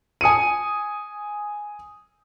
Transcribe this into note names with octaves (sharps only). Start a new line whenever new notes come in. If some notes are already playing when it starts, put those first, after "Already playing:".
G#5 D#6 C#7 D#7